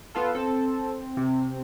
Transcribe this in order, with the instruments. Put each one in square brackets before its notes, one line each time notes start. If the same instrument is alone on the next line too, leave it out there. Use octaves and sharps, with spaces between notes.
[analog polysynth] B3 F4 A4
[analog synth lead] C4 [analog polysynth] A4
[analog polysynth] C3